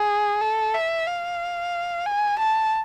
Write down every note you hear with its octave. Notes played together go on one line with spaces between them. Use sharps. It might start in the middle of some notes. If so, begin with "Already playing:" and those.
Already playing: G#4
A4
E5
F5
G#5
A5